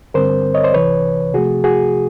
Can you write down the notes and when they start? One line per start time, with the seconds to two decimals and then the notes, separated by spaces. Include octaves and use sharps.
0.14 G2 D3 G3 C4 A#4 C5
0.54 C#5 D#5
0.64 C5 D5
0.74 C2 C3 E3 B4 C#5
1.34 C3 F3 A3 F#4 G#4
1.64 F#4 G#4